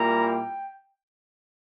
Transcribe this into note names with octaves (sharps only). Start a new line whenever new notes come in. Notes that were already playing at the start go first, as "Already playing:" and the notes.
Already playing: A#2 G3 A#3 E4 A#5
G5